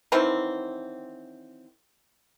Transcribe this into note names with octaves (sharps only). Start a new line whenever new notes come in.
D#3 E3 F#3 C4